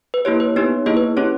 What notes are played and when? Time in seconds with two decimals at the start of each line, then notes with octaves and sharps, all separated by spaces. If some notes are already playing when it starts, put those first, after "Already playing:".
0.14 B4
0.25 A#3 E4 G4 C#5
0.40 B4
0.56 B3 D#4 G4 C#5
0.86 A#3 E4 G#4 D#5
0.97 B4
1.17 C#4 E4 G4 C#5